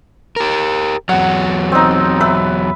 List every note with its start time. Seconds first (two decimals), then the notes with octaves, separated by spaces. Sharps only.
0.36 G4 A#4
1.09 E2 F#3 F#5
1.72 C4 D#4
2.21 B4 E5